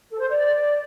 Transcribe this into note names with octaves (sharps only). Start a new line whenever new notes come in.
A4
C5
D5